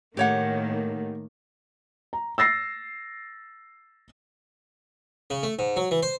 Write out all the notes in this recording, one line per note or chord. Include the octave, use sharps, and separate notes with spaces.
A2 D#3 A#3 G4 C#5 F#5
A#5
E6 A6 A#6 C7
C#3
A3
G#2
F#3
E3
C5